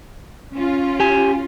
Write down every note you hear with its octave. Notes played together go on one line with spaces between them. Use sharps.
C#4 F4
G4 G#5